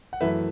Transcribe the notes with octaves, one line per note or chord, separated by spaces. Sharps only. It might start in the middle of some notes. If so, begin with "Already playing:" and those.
F#5
F#2 E3 A3 B4 E5